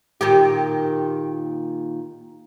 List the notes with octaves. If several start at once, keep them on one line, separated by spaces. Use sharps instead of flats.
A#2 D#3 G4